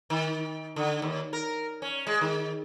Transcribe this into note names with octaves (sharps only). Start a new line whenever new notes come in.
D#3
D3
D#2
A#4
C#4
G#3
D#3